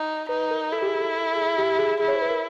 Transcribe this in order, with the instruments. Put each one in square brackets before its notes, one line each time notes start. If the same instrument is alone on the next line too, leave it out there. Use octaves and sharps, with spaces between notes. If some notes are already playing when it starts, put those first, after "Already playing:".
Already playing: [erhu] D#4
[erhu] D#4 [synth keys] B4
[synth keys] A#4
[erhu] E4 [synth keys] A4
[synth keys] G4
G#4
A4
A4
A4
G#4
G4
G#4
[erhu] E4 [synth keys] G#4
[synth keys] C#5
C5
B4
A#4